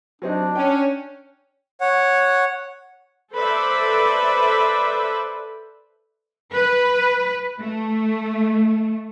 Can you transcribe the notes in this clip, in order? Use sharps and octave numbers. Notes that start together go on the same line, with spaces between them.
F#3 C4 D4 D#4
C#4 G5
C#5 F#5
A4 B4 C5 D5 E5
B4
A3